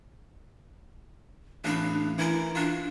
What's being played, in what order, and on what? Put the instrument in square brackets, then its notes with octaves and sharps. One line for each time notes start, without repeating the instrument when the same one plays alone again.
[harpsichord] A1 F5 B5 [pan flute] D4
[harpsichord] E3 A#4 G#5 [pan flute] E4
[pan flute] D4 [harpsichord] F4